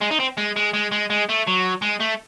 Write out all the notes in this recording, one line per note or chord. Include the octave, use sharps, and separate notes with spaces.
G#3
D#4
C4
G#3
G#3
G#3
G#3
G#3
A3
F#3
G#3
A3